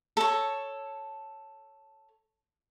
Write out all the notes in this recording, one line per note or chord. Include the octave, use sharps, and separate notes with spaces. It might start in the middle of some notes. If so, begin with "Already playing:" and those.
A4 C#5